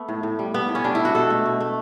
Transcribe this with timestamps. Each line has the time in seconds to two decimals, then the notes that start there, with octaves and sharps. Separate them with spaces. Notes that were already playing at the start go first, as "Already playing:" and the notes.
Already playing: A3 B3
0.09 A2
0.23 A2
0.39 G3
0.54 G3 B3
0.69 A2
0.75 C#4
0.84 G3 D4
0.95 E4
1.00 G3
1.05 F#4
1.15 B2 A4
1.30 A3
1.46 B2
1.60 A3